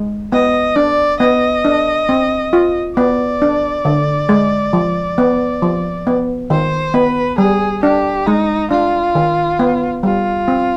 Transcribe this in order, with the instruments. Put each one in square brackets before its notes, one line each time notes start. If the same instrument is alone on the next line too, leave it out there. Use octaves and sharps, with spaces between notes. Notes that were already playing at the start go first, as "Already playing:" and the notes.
Already playing: [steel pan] G#3
[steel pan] B3 [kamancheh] D#5
[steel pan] D4 [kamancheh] D5
[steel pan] B3 [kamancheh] D#5
[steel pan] D4
C4
F4
[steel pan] B3 [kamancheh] D5
[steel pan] D4
D3
G#3
F3
B3
F3
B3
[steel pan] D#3 [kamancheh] C5
[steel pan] B3 [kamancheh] B4
[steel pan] G3 [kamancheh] G#4
[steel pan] D4 [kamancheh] G4
[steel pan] G#3 [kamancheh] D#4
[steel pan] D4 [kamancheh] F4
[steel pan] D#3
B3
[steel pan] G3 [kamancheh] F4
[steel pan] C4